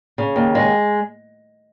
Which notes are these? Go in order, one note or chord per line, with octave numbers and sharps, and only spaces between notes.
C#3
D#2
G#3